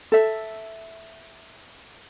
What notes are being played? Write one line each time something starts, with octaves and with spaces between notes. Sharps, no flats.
A4 E5